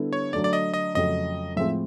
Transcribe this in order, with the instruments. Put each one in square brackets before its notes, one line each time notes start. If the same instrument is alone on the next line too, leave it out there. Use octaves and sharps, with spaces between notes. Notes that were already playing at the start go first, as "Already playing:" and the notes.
Already playing: [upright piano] D3 G3 B3 E4 A4
[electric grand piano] C#5
[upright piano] D3 F#3 A3 D4 [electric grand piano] D5
[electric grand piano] D5
D#5
D#5
[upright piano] F2 C#3 F#3 A3 [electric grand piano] D#5
[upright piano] A2 F3 G#3 C4 [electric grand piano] E5